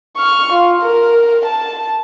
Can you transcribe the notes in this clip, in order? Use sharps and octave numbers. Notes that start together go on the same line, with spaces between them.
C#6 F6
F4
A#4
A5